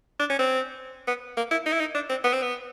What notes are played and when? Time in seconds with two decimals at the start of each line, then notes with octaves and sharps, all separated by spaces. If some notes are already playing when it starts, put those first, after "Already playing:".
0.20 D4
0.30 C#4
0.39 C4
1.07 B3
1.37 A#3
1.51 E4
1.66 D#4
1.73 E4
1.80 D#4
1.95 D4
2.10 C4
2.24 B3
2.33 C4
2.42 B3